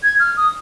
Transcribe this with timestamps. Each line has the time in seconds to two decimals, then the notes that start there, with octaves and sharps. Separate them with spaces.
0.03 G#6
0.20 F6
0.37 D#6